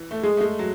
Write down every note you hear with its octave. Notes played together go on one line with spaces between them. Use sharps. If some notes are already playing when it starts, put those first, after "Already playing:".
Already playing: E3
A3
G#3 G#4
A3
G#3
F#3